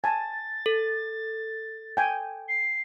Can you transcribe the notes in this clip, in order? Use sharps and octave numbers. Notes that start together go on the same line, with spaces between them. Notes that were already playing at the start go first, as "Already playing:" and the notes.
G#5 A5 A6
A4
G5 G#5
C7